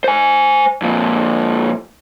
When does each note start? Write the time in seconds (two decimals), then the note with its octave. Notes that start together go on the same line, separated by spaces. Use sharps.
0.04 C5 G#5
0.82 F2 A#2